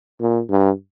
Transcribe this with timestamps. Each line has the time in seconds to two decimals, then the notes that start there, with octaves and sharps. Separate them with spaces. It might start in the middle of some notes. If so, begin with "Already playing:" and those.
0.21 A#2
0.50 G2